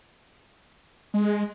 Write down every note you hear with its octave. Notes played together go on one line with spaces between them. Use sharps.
G#3